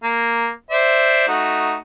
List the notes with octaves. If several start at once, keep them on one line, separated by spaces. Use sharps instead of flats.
A#3
C5 D5 E5
A3 D#4 F#4